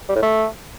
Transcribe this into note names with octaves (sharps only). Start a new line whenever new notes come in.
G3
A2
A3